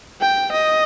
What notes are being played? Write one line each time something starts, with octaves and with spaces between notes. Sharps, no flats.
G5
D#5